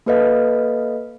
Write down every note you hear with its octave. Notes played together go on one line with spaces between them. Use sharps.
A#3 A4 B4 D#5 F5